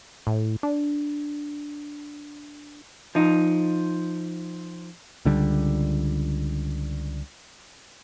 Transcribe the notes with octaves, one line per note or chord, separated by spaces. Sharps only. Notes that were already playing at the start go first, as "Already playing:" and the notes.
A2
D4
F3 D#4
C#2 D3 G3